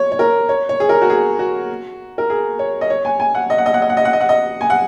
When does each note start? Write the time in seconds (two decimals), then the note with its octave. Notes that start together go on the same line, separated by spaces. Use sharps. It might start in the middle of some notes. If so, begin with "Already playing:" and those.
Already playing: C#5
0.12 C#5
0.19 A#4
0.49 C#5
0.69 C#5
0.80 G#4
0.89 A#4
1.02 F#4
1.10 G#4
1.39 F#4
2.18 A#4
2.30 G#4
2.59 C#5
2.81 D#5
2.90 C#5
3.05 G#5
3.20 G#5
3.35 F#5
3.50 D#5
3.58 F#5
3.66 D#5
3.74 F#5
3.82 D#5
3.90 F#5
3.97 D#5
4.05 F#5
4.13 D#5
4.21 F#5
4.29 D#5
4.61 G#5
4.70 F#5